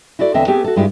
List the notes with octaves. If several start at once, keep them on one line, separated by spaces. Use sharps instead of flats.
E4 F#4 A4 D5
E2 D3 C4 D#5 E5
A3 B3 C4 G4 G#4
F#4 A4
G2 G#3 E4 F4 G4